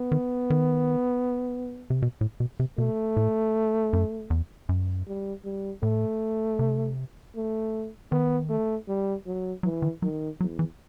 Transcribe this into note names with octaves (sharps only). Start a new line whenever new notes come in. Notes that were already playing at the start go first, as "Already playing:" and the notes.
Already playing: B3
D#3
D#3
C3
B2
A2
B2
C3
B2 A3
A2
F#2
E2
F#2
G3
G3
A2 A3
C3
A3
D#3 B3
A3
G3
F#3
E3 F#3
D#3
D#3 F#3
E2 F#3
E3